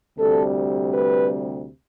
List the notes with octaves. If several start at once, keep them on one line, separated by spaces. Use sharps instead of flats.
D2 C3 G3 A4
B4